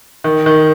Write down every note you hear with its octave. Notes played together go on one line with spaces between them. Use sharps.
D#3
D#3